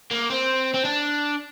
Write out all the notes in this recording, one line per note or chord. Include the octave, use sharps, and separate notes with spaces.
A#3
C4
C4
D4